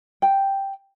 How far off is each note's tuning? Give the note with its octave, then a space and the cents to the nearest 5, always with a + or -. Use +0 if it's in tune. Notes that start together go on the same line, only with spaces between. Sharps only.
G5 +0